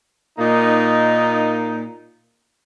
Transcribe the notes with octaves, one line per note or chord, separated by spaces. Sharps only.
A#2 A#3 D#4